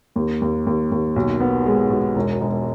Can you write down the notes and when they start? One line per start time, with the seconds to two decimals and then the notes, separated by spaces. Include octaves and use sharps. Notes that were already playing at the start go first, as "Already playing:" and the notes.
0.16 D#2
0.42 D#2
0.67 D#2
0.92 D#2
1.16 B1
1.40 B3
1.66 G#3
1.90 B2
2.16 E1
2.41 E1